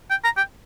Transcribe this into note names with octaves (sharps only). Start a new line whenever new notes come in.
G5
A#5
G5